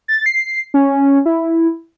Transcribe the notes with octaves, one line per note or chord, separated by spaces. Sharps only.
A6
C7
C#4
E4